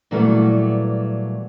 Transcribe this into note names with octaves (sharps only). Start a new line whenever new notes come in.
A#2 E3 F#3 G3 A3 B3